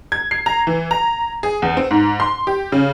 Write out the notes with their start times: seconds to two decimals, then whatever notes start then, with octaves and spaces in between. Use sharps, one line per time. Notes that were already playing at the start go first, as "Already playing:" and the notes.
0.12 G#6
0.31 C7
0.46 A#5
0.67 E3
0.91 A#5
1.43 G#4
1.62 E2
1.77 C4
1.91 G#2
2.20 C6
2.47 G4
2.72 C#3